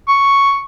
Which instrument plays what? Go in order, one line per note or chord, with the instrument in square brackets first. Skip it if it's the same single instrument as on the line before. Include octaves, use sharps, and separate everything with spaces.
[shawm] C#6